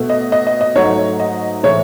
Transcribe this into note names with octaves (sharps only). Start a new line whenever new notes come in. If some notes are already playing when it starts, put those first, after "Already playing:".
Already playing: B2 A3
D#5
D#5
D#5
D#5
G#2 F#3 A3 C#5
D#5
A2 E3 G#3 C#5